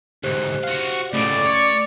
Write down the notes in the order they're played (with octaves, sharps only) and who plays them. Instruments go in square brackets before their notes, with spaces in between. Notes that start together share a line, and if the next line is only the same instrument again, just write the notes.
[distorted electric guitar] D2 G#2 [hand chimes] G4 C5 F#6
[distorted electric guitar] F#4 F5
[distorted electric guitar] C#2 A2 [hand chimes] A3 C#4 D7 [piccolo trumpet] D5
[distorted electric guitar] C#5